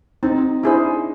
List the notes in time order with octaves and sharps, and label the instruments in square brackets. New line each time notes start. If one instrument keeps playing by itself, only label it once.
[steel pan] C4 [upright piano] D#4
[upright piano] D4 [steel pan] E4 G#4 C5